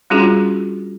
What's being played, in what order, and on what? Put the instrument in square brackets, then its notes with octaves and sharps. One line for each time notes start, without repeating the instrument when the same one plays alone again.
[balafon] G3 C#4 D4 F4 F#4 G#4